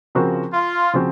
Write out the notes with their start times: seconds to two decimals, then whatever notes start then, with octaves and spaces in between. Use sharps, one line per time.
0.15 C#3 F3 C4 F#4 A#4
0.54 F4
0.93 C#3 F3 C4 F#4